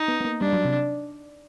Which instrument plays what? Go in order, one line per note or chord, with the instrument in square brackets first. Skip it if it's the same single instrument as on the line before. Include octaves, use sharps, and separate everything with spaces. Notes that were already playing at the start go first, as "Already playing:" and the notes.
Already playing: [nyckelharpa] D#4
[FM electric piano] B3
B3
A#3
[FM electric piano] G3 [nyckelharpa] D4
[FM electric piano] F#3
C3